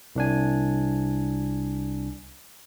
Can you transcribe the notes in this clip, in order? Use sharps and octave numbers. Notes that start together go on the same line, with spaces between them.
C2 D4 G#5